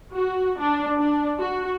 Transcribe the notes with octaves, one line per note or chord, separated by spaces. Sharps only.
F#4
D4
D4
F#4